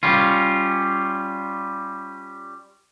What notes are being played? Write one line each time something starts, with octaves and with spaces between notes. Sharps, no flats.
G3 C#4 F4